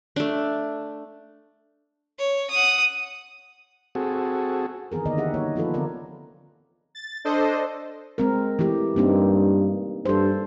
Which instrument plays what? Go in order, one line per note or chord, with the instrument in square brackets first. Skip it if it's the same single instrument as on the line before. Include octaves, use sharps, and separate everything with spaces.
[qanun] A3 D4
[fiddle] C#5
F#5 D#6
[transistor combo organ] C4 F#4 G#4 A4
[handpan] D#3 E3 B3 G#4 A#4
D3 D#3 A#3 B3 D5 D#5
E3 D#4 G4 G#4 E5 F#5
F#3 A#3 B3 E4 C#5 D#5
F3 B3 F4 A4 B4
D3 B3 C4 F4 A#4 D5
[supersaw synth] A6
D4 A4 C5 D#5
[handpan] G#3 C4 A#4
E3 A3 G4
[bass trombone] G2 [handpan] A#3 C4 D#4
[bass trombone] G2 [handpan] A4 C5